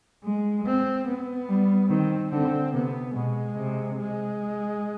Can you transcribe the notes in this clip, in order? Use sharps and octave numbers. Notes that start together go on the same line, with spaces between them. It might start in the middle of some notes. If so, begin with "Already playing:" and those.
G#3
C4
B3
G3
D#3 C4
D3 C4
C3 B3
B2 G#3
C3
G#3